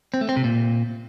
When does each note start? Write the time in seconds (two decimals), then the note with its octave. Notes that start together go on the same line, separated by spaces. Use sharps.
0.14 C4
0.21 A3
0.29 C4
0.36 C3
0.44 A#2